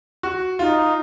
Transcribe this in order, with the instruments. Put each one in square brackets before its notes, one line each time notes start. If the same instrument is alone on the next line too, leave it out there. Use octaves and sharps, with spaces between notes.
[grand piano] F#4
[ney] D#4 [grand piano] F4